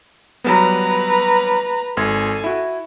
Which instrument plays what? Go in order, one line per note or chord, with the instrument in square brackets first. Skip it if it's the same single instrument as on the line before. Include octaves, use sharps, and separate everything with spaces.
[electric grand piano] F#3 G3 B3 [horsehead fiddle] B4 A#5
[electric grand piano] G#1 C6 G#6 [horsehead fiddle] A4 G#5
[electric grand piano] E4 F#4